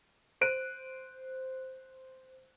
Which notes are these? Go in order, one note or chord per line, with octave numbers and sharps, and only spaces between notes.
C5 F#6 D7 D#7